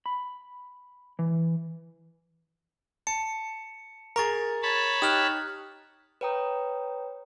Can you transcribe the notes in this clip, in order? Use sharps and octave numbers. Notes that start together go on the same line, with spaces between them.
B5
E3
A5 C#7
G#4 A#4 A#5 C#6 A6
C#5 A5 B5
D#4 G4 D#6 F6 F#6
B4 C#5 G5 A#5 D#6